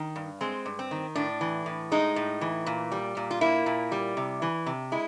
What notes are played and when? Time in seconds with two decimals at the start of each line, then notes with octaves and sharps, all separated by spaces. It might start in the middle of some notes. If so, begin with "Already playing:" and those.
Already playing: D#3
0.16 G2
0.41 G#3 C4
0.66 G2
0.79 C4
0.91 D#3
1.15 A2 D4
1.41 E3
1.66 A2
1.92 G#3 D#4
2.16 A2
2.41 E3
2.66 A#2
2.92 G3
3.17 A#2
3.31 F4
3.41 A#3 E4
3.66 A#2
3.92 G3
4.17 C3
4.42 E3
4.66 C3
4.92 G#3 E4